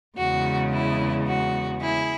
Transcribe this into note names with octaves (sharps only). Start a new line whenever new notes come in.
E2 C#3 G#3 F#4
E4
F#4
E4 G#4